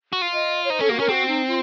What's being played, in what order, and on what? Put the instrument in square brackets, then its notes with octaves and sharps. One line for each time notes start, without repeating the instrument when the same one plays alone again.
[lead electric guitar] F#4
F4
[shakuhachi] D#5
C#5
[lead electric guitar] D#4 [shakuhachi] C5
[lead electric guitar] C#4 [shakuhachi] A4
[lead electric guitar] A#3 [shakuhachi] F#4
[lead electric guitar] C#4 [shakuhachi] A#4
[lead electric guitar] C4 [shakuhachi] F#4
[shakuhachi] D#4
F4